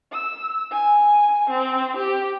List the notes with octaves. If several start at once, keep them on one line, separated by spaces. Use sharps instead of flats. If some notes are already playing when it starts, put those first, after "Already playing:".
E6
G#5
C4
G4